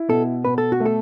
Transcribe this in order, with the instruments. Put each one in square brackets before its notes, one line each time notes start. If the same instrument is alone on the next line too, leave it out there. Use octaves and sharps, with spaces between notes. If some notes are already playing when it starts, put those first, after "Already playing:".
Already playing: [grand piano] E4
[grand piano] B2 [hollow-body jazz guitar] A4
[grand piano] B2 [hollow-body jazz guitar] B4
[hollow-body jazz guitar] A4
F#4
[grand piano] A3
[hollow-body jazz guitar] A4